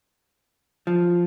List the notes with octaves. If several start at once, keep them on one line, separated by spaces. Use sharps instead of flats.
F3